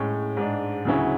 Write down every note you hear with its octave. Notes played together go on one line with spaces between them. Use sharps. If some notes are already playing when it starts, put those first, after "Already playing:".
Already playing: A2 G#3 C#4
G#2 G#3 D4
D2 C#3 F#3 C#4 E4